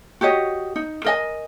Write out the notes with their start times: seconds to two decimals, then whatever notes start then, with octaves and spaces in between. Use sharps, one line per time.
0.21 F#4 G4 C#5 D#5
0.76 D#4
1.05 A#4 D#5 G#5